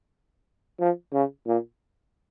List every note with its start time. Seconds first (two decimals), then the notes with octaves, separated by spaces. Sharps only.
0.80 F3
1.13 C#3
1.47 A#2